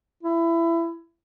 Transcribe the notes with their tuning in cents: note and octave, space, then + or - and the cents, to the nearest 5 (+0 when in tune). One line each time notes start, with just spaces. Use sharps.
E4 +20